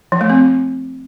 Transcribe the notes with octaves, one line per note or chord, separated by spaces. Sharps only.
F3
A3
C4